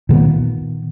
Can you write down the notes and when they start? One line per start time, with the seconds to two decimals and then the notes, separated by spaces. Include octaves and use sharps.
0.09 A#2 D#3 A#3 B3